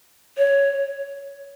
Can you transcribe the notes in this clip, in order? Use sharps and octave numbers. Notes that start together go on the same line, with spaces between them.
C#5